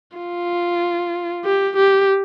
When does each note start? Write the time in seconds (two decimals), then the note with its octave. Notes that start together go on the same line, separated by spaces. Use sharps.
0.17 F4
1.45 G4
1.77 G4